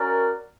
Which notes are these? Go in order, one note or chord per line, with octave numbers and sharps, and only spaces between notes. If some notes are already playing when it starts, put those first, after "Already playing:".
Already playing: C#4 F#4 A#4 D5